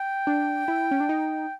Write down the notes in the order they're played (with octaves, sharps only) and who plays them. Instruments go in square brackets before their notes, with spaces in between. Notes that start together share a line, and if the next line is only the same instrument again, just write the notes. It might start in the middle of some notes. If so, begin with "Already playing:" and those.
Already playing: [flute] G5
[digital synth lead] D4
E4
C#4
D4
D#4